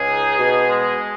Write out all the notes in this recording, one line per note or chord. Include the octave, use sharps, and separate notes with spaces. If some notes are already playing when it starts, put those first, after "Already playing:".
Already playing: C#2 G#4
D#4
B2
G#3